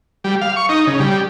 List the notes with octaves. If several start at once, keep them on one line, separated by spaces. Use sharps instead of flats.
G3
F5
C#6
D#4
C#3
G3